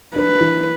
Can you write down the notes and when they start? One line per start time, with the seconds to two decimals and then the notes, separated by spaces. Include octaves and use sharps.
0.16 D4 B4
0.41 E3